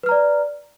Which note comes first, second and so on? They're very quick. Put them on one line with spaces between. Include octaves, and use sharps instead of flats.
B4 F6 A#5 D5